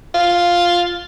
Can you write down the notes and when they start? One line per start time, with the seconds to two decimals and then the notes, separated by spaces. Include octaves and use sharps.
0.14 F4